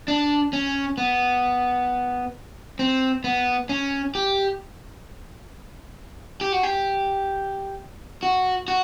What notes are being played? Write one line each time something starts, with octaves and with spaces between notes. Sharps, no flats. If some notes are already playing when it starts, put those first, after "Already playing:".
D4
C#4
B3
C4
B3
C#4
G4
G4
F#4
G4
F#4
F#4